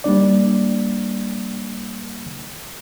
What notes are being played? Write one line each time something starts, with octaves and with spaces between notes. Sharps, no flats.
G3 A#3 D4 D5